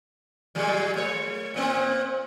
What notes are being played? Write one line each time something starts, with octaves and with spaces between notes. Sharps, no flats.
A#2 F#3 G#3
A3 C#5
A#2 A#3 C4